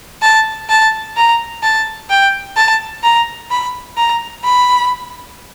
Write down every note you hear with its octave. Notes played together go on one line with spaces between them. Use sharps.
A5
A5
A#5
A5
G5
A5
A#5
B5
A#5
B5